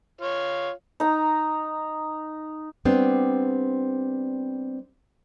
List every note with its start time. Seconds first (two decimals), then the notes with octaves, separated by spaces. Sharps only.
0.21 F4 C#5 F5
1.00 D#4 A#5
2.85 G3 B3 C4 D4 C5